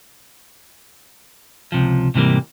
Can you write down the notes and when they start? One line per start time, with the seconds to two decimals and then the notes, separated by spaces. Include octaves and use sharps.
1.72 C#2 C3 F3
2.14 G#2 C3 E3 G3 A#3